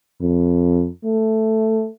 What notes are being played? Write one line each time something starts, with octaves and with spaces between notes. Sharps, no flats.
F2
A3